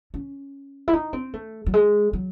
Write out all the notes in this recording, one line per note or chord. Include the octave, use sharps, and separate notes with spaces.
C#4
E4
D#4
C4
A3
F#3
G#3
F#3